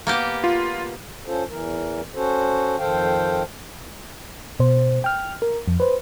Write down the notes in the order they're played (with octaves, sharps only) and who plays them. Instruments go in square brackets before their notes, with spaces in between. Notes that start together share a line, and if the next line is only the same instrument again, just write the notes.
[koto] A#3 B3 G4
[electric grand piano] F4
[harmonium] C#4 F4 A4 C5
E2 E3 A#4
C#4 F#4 A4 C5
F2 D#3 A4 C5 F5 G5
[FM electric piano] B2 C5
G5 F6
A#4
F2
B4 C5